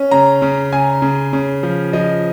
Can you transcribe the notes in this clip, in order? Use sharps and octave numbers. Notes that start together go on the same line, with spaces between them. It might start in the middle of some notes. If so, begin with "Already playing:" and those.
Already playing: C#4
C#3 A#5
C#3
C#3 G#5
C#3
C#3
F3
F3 D#5